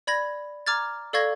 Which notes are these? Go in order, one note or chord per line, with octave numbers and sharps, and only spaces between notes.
D5 B5 G#6 A#6
A#5 D6 F6 G#6 A6
A4 D5 F5 C#6 G#6 A#6